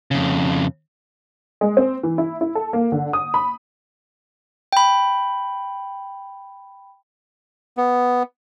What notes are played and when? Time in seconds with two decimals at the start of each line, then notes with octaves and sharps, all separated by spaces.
0.11 F2 C#3
1.61 G#3
1.77 C4
2.03 E3
2.18 E4
2.41 E4
2.55 A4
2.73 A#3
2.92 D3
3.13 D#6
3.34 B5
4.73 G5 B5
7.77 B3